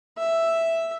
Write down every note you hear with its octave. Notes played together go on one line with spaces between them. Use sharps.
E5